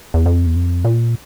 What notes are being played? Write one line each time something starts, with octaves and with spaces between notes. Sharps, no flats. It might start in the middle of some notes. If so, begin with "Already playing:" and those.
E2
F2
E2
F2
A#2